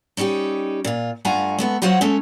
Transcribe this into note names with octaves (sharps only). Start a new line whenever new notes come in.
G3 C#4 D#4 F#4 G4
A#2 F4
G2 A3 F4 F#5 G#5 A#5
G#3 A3 B3
F#3 F4 F#4 C5 C#5 F#5
G#3 A3 C#4 A4